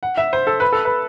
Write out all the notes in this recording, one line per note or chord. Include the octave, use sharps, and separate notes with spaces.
F#5
E5
C5
A4
B4
A4
B4